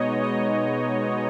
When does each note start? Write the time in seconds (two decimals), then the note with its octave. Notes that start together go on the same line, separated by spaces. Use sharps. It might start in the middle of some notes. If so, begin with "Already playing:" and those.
Already playing: B2 G#3 B3 D#4 C#5 D#5
0.23 D#5